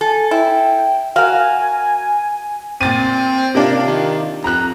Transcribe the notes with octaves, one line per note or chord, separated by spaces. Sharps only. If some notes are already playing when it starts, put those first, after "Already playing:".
A4 G#5
E4 G5
F#4 A#4 F5 G#5
A#2 C4 A6 D#7
C3 A#3 D4 F4
D#3
F2 A#5 F#6